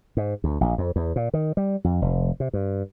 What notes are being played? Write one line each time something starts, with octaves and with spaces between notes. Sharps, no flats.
G#2
D2
A#1
F2
E2
A#2
D#3
G3
F2
F1
C3
G2